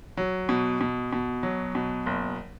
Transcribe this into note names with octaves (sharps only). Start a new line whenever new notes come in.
F#3
B2
B2
B2
F#3
B2
F#1